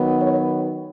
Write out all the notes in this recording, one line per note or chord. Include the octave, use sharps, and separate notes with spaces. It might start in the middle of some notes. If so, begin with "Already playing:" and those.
Already playing: D#3 F#3 B3
C#5